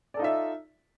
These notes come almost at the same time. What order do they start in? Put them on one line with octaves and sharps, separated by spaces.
D5 A4 D#4 F4 E5